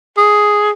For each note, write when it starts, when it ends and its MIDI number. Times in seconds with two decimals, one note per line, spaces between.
0.17 0.71 68